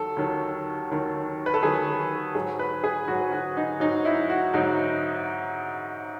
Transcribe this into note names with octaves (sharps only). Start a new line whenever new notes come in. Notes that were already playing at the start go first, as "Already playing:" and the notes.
Already playing: D#2 D#3 F#3 A4
D#2 D#3 F#3
D#2 D#3 F#3
B4
A4
D#2 D#3 F#3 G#4
G#2 F#3 G#4
B4
G#4
G#2 F#3 F#4
F#4
D#4
G#2 F#3 D#4
E4
F#4
G#2 F#3 D#4